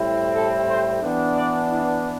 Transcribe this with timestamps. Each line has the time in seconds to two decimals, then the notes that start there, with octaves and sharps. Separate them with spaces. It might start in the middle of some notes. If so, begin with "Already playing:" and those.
Already playing: A2 G3 C4 E4
0.35 A4
0.69 C5
1.02 E3 B3 D4
1.35 D5
1.69 E4